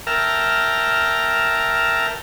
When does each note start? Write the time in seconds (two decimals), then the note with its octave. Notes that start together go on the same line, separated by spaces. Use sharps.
0.07 A#4 E5 G5 A5 A#5 F6